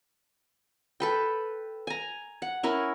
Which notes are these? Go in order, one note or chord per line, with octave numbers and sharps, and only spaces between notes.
A4 B4 G5
G#5 A#5
F#5
C#4 E4 A#4